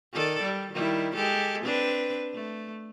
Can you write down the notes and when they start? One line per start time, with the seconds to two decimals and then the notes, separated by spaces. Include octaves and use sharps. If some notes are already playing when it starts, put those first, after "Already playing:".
0.13 D#3 A4 D5
0.42 G3
0.73 D#3 G3 E4
1.15 G#3 G4 A4
1.64 C4 D4 B4
2.34 A3